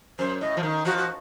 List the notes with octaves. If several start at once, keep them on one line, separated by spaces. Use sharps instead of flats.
F#2 C5
A2 D#5
F3
D#3
F3 F#4
F#4